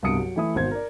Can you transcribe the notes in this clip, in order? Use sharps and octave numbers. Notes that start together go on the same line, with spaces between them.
C2 G2 B2 D#6 C#7 D7
F#3
E3 A3 E4 E5 D#6
G#1 B2 C5 G#6
A#4 D5